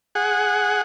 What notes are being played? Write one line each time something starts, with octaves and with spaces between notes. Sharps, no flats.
G#4 F#5